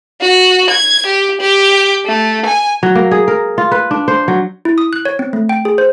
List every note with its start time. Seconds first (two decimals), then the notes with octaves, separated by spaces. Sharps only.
0.21 F#4
0.70 G#6
1.06 G4
1.41 G4
2.06 A3
2.46 G#5
2.83 F#3
2.95 A#3
3.11 G#4
3.28 A#4
3.58 F4
3.72 B4
3.91 D4
4.08 C5
4.28 F#3
4.65 E4
4.78 D#6
4.93 F#6
5.05 C#5
5.19 C4
5.33 A3
5.49 G5
5.65 G#4
5.78 C5